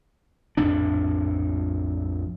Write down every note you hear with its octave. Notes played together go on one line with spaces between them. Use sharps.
A#1 F2 A2 D4